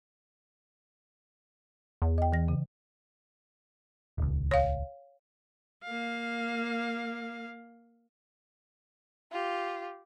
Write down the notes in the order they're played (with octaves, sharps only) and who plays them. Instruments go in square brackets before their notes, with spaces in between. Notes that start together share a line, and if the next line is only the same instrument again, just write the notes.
[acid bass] E2
[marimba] D#5 G5
E3 A#6
C#3
[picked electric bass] D#1 C#2
[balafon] C#5 F5
[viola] A#3 F5
[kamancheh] F4 G4